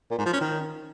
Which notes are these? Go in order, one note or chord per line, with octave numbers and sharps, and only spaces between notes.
A#2
G#2
F3
C#4
D#3